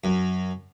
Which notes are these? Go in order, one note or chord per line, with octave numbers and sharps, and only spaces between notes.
F#2